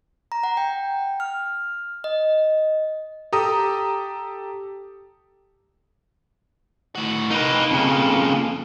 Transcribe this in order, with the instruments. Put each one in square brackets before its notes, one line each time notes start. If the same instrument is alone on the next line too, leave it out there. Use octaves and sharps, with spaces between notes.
[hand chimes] A#5
F#5
G5
F6
D#5
[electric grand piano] G4 A4 A#5 D#6
[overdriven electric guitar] A2 F#4
[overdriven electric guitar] A#3 [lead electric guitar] D#4 B4
[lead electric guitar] F2 C#3